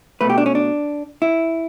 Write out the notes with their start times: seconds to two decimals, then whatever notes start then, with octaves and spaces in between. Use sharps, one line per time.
0.21 B2 A3 B4
0.30 G4
0.38 D4
0.46 C#4
0.55 D4
1.22 E4